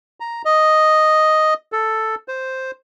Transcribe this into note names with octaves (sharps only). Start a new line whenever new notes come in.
A#5
D#5
A4
C5